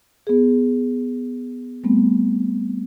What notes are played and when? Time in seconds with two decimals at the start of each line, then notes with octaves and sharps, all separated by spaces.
0.27 B3 G#4
1.84 G3 A3 B3 C4